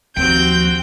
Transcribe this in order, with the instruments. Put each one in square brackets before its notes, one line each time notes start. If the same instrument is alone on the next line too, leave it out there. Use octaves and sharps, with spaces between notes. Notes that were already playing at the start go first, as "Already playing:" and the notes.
[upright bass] D#2 F3 [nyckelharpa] C4 F#4 [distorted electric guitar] G5 [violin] G6